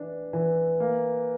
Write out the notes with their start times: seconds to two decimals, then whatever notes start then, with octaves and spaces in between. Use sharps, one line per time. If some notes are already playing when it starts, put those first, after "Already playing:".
Already playing: E3 D4
0.33 E3
0.80 A#3